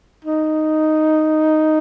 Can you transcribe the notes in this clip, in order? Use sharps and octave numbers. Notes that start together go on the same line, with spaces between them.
D#4